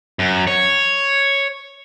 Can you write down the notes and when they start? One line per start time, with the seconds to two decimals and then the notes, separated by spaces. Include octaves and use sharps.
0.19 F#2
0.47 C#5